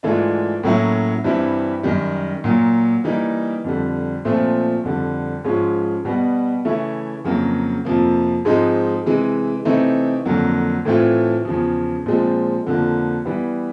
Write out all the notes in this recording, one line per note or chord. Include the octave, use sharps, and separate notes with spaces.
G#2 E3 A3 D4 F4
A2 F#3 A#3 C#4 E4
G2 E3 G3 C4 E4
F#2 D#3 G3
A#2 F#3 A#3
E3 G3 A#3 D#4
F2 D3 G3
A#2 F3 A3 C4 F4
F2 D3 G3
G#2 F3 G#3 C#4 F4
B2 G3 B3
C#3 E3 A3 C#4 E4
F2 C#3 F#3 A#3
F2 C3 F3 A#3
G#2 F3 G#3 C4 D#4
C3 E3 G#3
C3 E3 A3 C4 D#4
F2 D3 F#3 A#3
A2 E3 A3 C4 F4
E2 C#3 F3
A#2 F3 G#3 C4
F2 D3 F3 A#3
E3 G3 B3